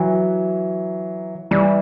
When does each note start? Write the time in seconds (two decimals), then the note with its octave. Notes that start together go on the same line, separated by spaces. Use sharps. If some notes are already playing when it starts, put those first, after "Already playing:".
Already playing: E3 F#3
1.51 E3 G3